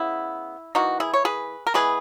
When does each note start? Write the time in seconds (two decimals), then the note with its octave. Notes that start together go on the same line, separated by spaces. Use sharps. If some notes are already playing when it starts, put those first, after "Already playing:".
Already playing: C#3 B3 E4
0.75 E3 A#3 D#4 F#4
1.00 E4 G#4
1.14 C#5
1.25 G#4 B4
1.67 A#4
1.74 E3 G#3 B3 G#4 B4